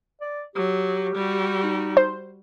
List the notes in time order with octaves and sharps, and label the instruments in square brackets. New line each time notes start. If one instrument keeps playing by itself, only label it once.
[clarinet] D5
[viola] F#3 [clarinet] G4
[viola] G3 F#4
[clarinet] D#4
[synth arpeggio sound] C5